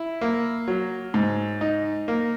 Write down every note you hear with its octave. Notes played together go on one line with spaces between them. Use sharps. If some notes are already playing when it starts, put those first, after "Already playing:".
Already playing: E4
A#3
F#3
G#2
D#4
A#3